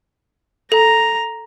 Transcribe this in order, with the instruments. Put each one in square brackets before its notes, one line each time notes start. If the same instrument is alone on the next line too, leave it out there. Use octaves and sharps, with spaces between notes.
[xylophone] A4 [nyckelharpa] A#5